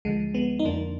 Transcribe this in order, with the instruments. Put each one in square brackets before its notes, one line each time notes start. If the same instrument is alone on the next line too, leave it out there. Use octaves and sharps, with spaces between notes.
[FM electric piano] D2 D3 F3 G#3
G#3 B3
D#4
F2 D3 F3 A#3 D4